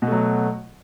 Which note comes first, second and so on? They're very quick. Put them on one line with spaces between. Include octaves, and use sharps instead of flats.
B2 A3 F#3